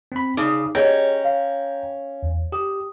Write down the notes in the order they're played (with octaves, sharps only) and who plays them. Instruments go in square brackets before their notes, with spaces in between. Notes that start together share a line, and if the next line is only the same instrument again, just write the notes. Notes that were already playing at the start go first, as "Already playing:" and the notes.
[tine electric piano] C4 B5
[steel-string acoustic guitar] C#3 [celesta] D#4 [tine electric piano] D6 D#6
[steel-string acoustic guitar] C#4 [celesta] G4 G#4 D#5 [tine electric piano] G5 A#5
[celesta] F5
[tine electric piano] E2
[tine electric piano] G4 [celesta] D#6